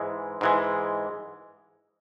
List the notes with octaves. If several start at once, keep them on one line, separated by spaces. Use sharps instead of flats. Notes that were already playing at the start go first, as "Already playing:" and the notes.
Already playing: G#2 E3 G#3
G#2 E3 G#3